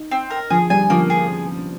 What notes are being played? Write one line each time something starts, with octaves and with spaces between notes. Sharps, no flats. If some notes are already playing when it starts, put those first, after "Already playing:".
Already playing: D#4
C4
A#4
F3 G#4
G3 G#5
F3 A#3
G#4